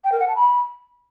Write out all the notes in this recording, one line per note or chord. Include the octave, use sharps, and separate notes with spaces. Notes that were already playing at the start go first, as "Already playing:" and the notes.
G5
A#4
F#5
A5
B5